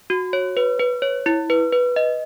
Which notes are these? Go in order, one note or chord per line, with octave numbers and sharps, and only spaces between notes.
F#4
C#5
B4
B4
C#5
E4
B4
B4
D#5